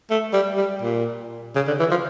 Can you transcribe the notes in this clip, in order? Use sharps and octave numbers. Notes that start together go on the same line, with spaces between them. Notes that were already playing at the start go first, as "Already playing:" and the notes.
A3
G3
G3
A#2
C#3
D3
E3
F3